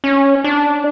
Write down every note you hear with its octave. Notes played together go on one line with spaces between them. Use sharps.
C#4
D4